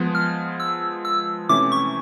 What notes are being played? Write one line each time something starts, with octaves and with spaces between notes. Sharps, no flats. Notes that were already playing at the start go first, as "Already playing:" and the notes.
Already playing: F3 G#3 B3
F6
E6
E6
C3 E3 A3 C#4 E4 D6
C#6